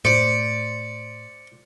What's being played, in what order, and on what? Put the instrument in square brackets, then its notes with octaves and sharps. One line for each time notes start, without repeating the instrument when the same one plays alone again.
[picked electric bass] A2 [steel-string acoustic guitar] C5 [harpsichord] D5 [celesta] C#7